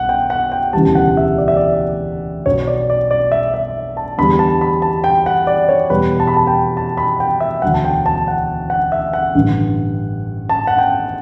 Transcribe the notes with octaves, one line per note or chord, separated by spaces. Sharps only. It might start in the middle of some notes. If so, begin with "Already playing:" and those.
Already playing: B1 F#5
G5
F#5
G5
E1 D2 C#3 E3 G3 A5
F#5
E5
D5
E5
D5
B1 B2 F#3 C#5
D5
D5
D5
E5
E5
A5
E2 D3 G3 B5
A5
B5
A5
G5
F#5
D5
C#5
E2 B2 G3 B4
A5
B5
A5
G5
A5
B5
G5
E5
E1 D2 D3 F#3 F#5
A5
G5
A5
F#5
F#5
E5
F#5
A1 G2 D3
A5
F#5
G5